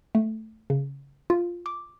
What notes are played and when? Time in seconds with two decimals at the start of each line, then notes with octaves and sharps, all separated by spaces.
0.15 A3
0.70 C#3
1.30 F4
1.66 D6